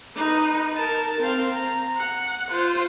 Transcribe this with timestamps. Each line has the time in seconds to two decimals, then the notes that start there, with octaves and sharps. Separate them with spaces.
0.16 D#4 B4
0.76 A#4 A5
1.20 C4 F5
1.52 A#5
1.98 F#5
2.50 F4 C5